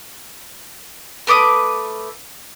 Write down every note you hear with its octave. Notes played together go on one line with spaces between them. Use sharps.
A3 B4 D6 D#6